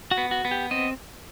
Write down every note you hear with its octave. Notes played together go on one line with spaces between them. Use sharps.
F#4
B3
F#4
B3
G4
C4 D#5